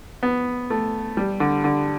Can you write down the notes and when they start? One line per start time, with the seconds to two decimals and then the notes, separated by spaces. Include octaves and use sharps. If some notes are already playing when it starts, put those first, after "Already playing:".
0.23 B3
0.70 A3
1.17 G3
1.40 D3
1.64 D3